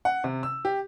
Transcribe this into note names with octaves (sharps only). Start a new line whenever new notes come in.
F#5
C3
E6
G4